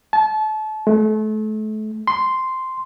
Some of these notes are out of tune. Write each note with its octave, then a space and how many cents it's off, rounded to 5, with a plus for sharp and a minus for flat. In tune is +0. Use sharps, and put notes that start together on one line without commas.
A5 -30
A3 -35
C6 -5